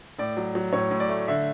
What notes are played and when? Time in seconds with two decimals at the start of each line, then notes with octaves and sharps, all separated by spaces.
0.19 A2 D5
0.37 F#3
0.55 F#3
0.73 A2 C#5
0.91 A2
1.00 D5
1.09 A3
1.28 D3 E5